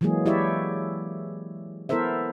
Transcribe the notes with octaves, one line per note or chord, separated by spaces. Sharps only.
E3 F#3 G#3 A#3 G#4
E4 G4 C#5 D5 E5
B3 E4 A4 A#4 C5 E5